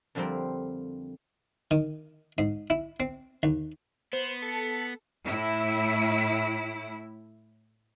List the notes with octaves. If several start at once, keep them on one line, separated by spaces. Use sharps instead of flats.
F2 D3 F3 G3 C4 A#4
D#3
G#2
E4
C4
D#2
B3 C5
A4
A2 E4